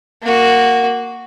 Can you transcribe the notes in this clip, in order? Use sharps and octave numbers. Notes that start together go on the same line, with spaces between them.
A#3 F#4